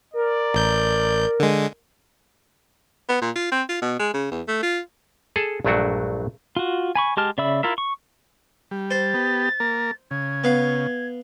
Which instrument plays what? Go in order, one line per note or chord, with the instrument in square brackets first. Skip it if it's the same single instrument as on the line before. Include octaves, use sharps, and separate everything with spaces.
[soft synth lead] A#4 [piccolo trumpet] D5
[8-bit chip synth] A1 G6
D3 G#3
[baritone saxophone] B3
A#2
F4
C4
F4
B2
G#3
C#3
E2
A3
F4
[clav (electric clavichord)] G#4 A4 A5
A#1 G2 F#3 A3 D4 F#4
[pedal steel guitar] F4 F#4
G#5 B5 C#6
G#3 G4 A5 F6
C#3 D5 E5 B5 E6
E4 F4 A#4 E5
C#6
[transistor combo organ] G3
[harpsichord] C5 [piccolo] A6
[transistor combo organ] B3 G4
A#3 A#4
[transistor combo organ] C#3 [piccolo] G#6
[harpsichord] B3 F5